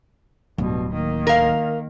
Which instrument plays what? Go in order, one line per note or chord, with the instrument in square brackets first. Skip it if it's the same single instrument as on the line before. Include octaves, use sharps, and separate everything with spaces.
[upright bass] D1 [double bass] G2 B2
[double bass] D#3 A#3
[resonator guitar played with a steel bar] A#4 F5